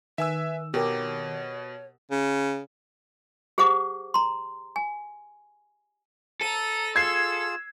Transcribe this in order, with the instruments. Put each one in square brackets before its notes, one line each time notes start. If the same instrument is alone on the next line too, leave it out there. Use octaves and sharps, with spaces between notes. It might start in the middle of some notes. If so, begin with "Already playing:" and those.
[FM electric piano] D#3 [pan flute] B4 [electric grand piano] E5 G#5 E6
[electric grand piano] B2 [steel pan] G4 A#4 [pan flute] C#5
[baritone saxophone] C#3
[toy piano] G4 G#4 C5 F#5 D6
A#5 C6
G#5
[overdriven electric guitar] A4 [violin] A#5 D#7
[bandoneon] F4 G#4 [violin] E6 [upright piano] G#6 C7